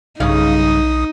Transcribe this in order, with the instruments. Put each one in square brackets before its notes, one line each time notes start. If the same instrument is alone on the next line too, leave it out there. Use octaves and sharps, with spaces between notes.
[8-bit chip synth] B1 D#6 [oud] G2 C#3 F5 [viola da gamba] D#4